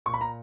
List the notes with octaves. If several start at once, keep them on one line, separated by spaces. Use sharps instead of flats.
A#2 C#6
B5
A#5